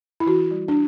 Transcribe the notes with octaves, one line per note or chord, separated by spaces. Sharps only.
E4
E3 F#4
G3
D4